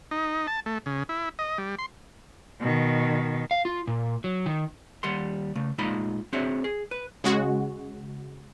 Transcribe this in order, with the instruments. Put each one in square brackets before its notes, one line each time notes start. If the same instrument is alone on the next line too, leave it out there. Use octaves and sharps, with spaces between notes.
[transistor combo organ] D#4
A5
A3
C#3
E4
D#5
G3
C6
[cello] B2 D#3
[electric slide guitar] F5
F4
A#2
F#3
D#3
[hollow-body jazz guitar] D#2 G3 F#5 C6
C#3 A3
A#2 G#3 D#4 F4 D#5 B5
C4 D4 F#4 G#4 C#5 E5
G#4
B4
[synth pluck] C#3 G#3 F#4